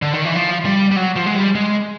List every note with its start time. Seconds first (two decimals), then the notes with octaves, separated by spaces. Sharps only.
0.02 D3
0.14 D#3
0.25 E3
0.36 F3
0.65 G3
0.91 G3
0.96 F#3
1.16 F3
1.26 G#3
1.35 G3
1.55 G#3